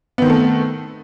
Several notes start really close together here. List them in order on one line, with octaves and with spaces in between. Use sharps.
B3 D#3 C4 A3